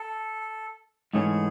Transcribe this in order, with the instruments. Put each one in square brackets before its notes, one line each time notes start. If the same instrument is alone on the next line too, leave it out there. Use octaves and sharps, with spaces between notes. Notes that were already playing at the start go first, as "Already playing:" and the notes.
Already playing: [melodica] A4
[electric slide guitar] G#2 E3 A3 C#4 [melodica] G#4